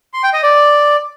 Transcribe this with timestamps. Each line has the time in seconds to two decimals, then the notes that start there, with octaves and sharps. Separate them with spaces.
0.13 C6
0.23 G5
0.33 D#5
0.43 D5